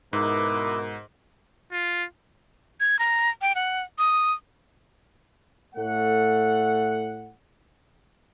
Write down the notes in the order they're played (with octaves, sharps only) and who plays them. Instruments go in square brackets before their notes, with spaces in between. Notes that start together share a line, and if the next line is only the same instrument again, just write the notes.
[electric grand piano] G#2 [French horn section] B2 A#4 [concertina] D#4 E4 B4 [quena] D6
[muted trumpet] F4
[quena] G#6
A#5
G5
F#5
D#6
[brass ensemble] A2 A3 F#5